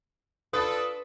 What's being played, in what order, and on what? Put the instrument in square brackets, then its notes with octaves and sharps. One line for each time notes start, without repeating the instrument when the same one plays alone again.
[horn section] D4 F4 A4 [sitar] B4 [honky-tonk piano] D#6